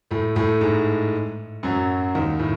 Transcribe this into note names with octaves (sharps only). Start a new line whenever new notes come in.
A2 A3
A2 A3
G#2 G#3
F#2 F#3
D#2 D#3
A2